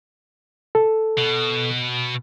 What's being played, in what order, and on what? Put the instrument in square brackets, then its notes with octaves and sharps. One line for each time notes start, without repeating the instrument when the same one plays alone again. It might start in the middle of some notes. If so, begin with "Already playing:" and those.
[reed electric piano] A4
[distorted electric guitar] B2